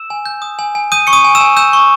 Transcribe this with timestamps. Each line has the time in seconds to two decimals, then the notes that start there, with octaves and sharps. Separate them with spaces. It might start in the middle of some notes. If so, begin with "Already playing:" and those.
Already playing: E6 E7
0.10 G#5
0.26 G6
0.42 D#6
0.59 G#5
0.75 G#5
0.92 D#6 G6 D#7
1.07 C#6 C#7
1.13 D#6 D#7
1.24 G#5
1.35 E6 E7
1.41 G#5
1.57 E6 G6 E7
1.73 C#6